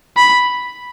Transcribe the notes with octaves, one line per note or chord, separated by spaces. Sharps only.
B5